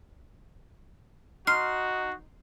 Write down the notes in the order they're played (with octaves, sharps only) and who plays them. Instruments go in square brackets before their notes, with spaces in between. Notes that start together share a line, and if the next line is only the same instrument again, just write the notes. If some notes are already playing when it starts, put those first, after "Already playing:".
[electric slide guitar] D#4 [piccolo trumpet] F#4 [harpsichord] C6 [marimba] F6